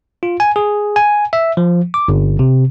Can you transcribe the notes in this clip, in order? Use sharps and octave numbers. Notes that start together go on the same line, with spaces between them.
F4
G#5
G#4
G#5
E5
F3
D6
G1
C3